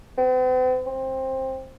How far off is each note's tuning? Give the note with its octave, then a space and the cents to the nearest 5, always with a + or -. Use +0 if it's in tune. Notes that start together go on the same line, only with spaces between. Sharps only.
C4 -45
C4 +15